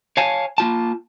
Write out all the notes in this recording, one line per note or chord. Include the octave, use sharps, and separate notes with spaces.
C#5 F5 G#5 A5
A#3 F4 A5